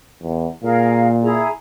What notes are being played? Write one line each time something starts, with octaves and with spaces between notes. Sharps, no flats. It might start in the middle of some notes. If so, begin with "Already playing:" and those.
E2
A#2 G#4 A#4 F5
E4 G#4 A#5